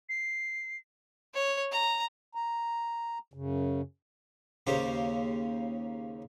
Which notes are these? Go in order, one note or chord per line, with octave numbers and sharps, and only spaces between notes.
C7
C#5
A#5
A#5
F#2 C#3
D#2 C#3 A#3 G4 C5